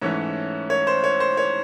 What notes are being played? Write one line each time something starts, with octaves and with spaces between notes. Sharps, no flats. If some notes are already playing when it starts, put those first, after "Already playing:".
G#2 E3 A3 C#4 C#5
C#5
C5
C#5
C5
C#5